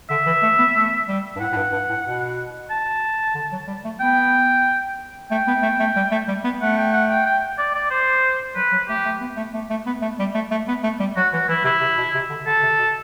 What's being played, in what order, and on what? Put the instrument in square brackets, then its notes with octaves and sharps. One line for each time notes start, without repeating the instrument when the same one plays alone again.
[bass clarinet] D3 [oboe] E5
[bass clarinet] E3
A3
B3
A3
G3
G2
[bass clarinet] A2 [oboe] F#5
[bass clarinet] A2
G2
G2
A2
B2
[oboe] A5
[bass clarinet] D3
F#3
G3
A3
[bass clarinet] B3 [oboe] G5
[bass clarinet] A3 [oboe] G5
[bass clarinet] B3
A3
A3
G3
A3
G3
B3
[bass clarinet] A3 [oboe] F#5
[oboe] G5
F#5
G5
G5
D5
D5
C5
[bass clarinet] F#3 [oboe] B4
[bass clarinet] F#3
[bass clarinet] A3 [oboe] G4
[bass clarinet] A3
B3
A3
A3
A3
B3
A3
G3
A3
A3
B3
A3
G3
[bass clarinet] F#3 [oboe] F#4
[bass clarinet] E3 [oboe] F#4
[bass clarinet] E3 [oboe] E4
[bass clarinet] C3 [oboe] E4
[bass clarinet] C3
B2
C3
D3
[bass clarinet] D3 [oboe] A4
[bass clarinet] C3
B2